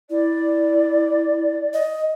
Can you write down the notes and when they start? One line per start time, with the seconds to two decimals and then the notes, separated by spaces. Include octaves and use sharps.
0.10 E4 D5
1.74 D#5